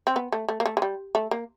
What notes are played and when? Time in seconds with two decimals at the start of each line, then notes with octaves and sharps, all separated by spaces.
0.07 C4
0.16 B3
0.32 A3
0.49 A3
0.60 A#3
0.66 A3
0.77 G#3
0.82 G3
1.15 A3
1.31 A#3